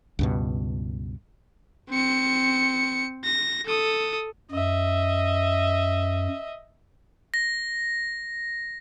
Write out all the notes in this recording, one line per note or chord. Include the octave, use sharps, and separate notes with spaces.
C#2 G2 B2
C4 C#7
A#6
A4 D#6
F#2 D#5 E5
A#6